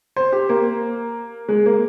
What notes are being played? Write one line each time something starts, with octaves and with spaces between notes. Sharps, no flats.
C5
G4
A#3
G#3
A#3